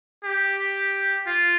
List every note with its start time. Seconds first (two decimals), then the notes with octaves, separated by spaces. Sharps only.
0.25 G4
1.27 F4